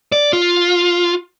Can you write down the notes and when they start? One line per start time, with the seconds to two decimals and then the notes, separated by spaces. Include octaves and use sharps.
0.12 D5
0.33 F4